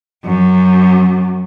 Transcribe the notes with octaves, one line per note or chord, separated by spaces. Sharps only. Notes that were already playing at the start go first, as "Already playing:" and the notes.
F#2